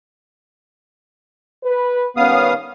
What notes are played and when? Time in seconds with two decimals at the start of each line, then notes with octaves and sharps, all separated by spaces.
1.64 B4
2.17 D#3 G3 B3 C#4 F5 D#6